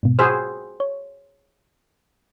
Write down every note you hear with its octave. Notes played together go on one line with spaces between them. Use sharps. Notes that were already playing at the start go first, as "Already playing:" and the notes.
G#2 B2
F#4 G#4 C5 B5 E6 F6
C#5